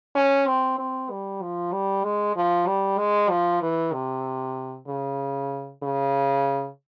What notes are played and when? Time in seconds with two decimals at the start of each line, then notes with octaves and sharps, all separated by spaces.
0.15 C#4
0.47 C4
0.79 C4
1.10 G3
1.42 F3
1.72 G3
2.04 G#3
2.36 F3
2.67 G3
2.98 G#3
3.30 F3
3.62 E3
3.93 C3
4.87 C#3
5.83 C#3